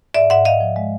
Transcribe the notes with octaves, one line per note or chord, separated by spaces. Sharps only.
G#2 D5 E5
G#2 E5 F#5
G#2 D#5 F5
F3
G#3